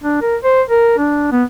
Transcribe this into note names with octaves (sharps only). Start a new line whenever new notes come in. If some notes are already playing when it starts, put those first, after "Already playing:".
D4
A#4
C5
A#4
D4
B3